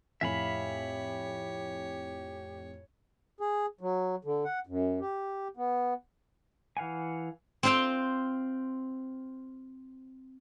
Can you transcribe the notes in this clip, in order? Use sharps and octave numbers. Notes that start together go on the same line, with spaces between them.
F2 A2 G4 C#5 E5 F5 G#5 B5
G#4
F#3
D3
F#5
F#2
G4
B3
E3 F5 F#5 G#5
C4 F4 C5 F5 G5